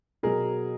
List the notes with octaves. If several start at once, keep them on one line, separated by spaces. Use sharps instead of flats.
B2 F#3 G#4 A#4